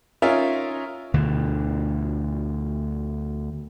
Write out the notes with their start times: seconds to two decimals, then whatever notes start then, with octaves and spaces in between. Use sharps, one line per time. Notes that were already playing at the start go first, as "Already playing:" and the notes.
0.22 C#4 D#4 F4 A#4 E5 G#5
1.14 D2 B2 D3